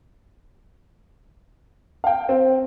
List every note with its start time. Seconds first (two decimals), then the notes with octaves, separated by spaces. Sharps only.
2.04 F5 G5
2.29 C4